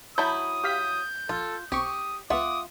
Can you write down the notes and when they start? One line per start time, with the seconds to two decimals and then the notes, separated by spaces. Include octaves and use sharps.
0.18 F#3 E4 A5 B5 D#6 G6
0.64 G4 F5 G6 B6
1.29 A#1 F4 A4
1.72 B1 C4 G4 C#6 D#6
2.30 C#2 B3 F4 E5 F#5 D6 D#6